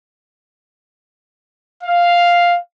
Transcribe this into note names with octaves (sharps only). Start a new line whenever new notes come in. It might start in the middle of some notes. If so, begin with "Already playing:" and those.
F5